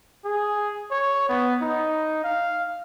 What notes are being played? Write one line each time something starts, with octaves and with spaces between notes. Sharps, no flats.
G#4
C#5
B3
D#4
F5